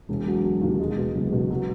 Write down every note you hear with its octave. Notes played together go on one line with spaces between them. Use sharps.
E1
F#3
F#3
D#2
G#3
B2
F#1
B2
F#3